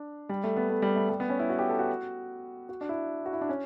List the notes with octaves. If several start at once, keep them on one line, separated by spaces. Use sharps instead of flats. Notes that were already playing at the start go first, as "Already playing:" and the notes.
Already playing: D4
G3
A3
B3
A3
G3
A3
G3
B3
C#4
E4
F#4
G4
A4
F#4
F#4
D4
E4
F#4
E4
D4
C#4